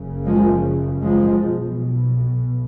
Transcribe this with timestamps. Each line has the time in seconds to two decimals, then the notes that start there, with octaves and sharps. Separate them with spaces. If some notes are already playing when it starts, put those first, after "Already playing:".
Already playing: F#1 F#2 C#3
0.26 F3 G#3
1.03 F3 G#3
1.42 B1 B2